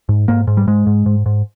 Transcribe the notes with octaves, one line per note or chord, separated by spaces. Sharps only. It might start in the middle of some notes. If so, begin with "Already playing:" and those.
G#2
G#2 A#3
G#2
G3
G#2 G#3
G#2
G#2
G#2